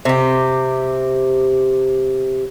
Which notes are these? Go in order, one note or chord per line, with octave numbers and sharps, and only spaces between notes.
C3 G4